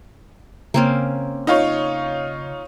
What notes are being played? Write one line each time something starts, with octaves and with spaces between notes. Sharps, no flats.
C#3 A#3 C4 C#4
D#4 F4 C#5